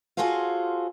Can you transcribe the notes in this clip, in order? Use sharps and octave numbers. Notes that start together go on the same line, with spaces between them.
F4 F#4 G#4 A4 C5 F5